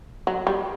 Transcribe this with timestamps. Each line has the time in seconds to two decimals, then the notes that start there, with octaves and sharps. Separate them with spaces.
0.27 F#3
0.47 G3